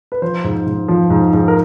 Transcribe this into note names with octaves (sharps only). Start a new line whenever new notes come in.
B4
F3 C5
G#2
G#2
F3
G#2
G#2
A#4